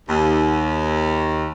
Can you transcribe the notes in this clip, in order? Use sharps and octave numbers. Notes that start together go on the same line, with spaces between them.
D#2